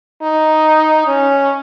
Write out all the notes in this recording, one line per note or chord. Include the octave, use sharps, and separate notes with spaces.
D#4
C#4